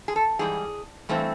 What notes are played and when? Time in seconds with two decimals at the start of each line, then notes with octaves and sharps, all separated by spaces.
0.08 G#4
0.16 A4
0.39 G#2 E3 G3 G#4
1.09 G2 E3 A3 C4